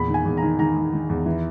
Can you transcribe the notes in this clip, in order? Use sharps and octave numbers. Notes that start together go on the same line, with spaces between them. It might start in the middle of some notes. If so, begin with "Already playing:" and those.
Already playing: E2 A#2 B5
D#3
G#5
E2
A#5
D#3
D#3 A#5
D#3
D#3
E2
E3